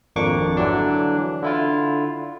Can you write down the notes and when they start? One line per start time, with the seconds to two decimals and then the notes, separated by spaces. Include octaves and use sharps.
0.16 G#1 F2 A#3 D4 C#6 D6
0.57 D3 E3 F#3 D4
1.42 D3 E4 F4